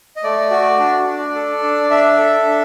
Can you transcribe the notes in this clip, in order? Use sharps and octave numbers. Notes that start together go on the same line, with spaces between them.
D#5
A3 D5
F#4
D4
D4
A4
D4
D4 E5
A4
D4